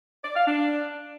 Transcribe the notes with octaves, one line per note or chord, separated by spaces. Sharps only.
D5
F5
D4